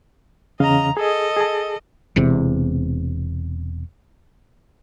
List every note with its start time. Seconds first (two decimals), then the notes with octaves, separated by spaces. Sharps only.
0.60 E2 C#3 D#5 F5 A#5
0.97 G#4 A4 D#5
1.36 G#4 A5
2.16 E1 E2 C3